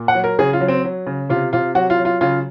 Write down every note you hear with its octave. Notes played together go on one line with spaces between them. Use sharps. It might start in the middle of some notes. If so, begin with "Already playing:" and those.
Already playing: A#2
F#5
F#3
A#4
C#3 G#4
F4
F#3
C4
F#3
C#3
C3 F4
C3 F4
F#3 F#4
F4
F#3
F4
C#3 F4